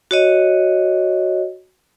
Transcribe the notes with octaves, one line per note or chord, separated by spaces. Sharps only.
F#4 C#5 D#5